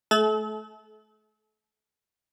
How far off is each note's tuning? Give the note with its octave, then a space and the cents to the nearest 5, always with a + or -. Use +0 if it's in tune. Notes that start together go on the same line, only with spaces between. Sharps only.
A3 -25 A4 -40